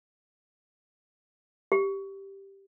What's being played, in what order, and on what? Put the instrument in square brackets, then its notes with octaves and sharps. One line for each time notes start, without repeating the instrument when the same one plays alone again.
[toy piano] G4